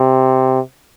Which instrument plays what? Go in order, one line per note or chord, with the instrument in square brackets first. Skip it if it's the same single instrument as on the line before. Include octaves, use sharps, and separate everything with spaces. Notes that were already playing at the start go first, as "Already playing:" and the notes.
Already playing: [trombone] C3